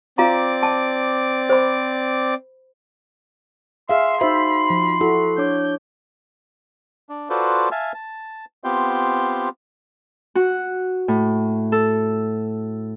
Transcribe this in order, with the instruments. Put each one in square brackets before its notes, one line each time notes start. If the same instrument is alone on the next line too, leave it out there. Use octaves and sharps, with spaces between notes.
[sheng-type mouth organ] C4 D5 D6 [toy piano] F4 F5 A#5
[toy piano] A5
C5 B5
[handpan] G#4 F5 [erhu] E5 [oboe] C6
[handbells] D#4 F#4 [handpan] C5 E5 [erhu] B5
[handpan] F3
[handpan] E4 F#4 [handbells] A4
[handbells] D4 C#5 D6 [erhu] G6
[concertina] D4
F4 F#4 A4 B4 C5 D5
E5 F5 G#5 A5 E6
A5
B3 C4 F4 G4 G5 C6
[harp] F#4
A2
A4